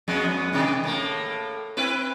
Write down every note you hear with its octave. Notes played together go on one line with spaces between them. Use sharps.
F2 G#3 B3
C3 D#3 E3
A2 A3 A#3
C4 E4 B4